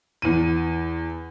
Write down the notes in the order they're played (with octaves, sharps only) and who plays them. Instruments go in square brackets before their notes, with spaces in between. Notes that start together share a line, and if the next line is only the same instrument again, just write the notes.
[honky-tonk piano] E2 D#7